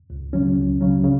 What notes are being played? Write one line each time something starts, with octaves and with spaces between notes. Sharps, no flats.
C#2
C#3 F#3 C#4
C#2
C#3 F#3 C#4
C#3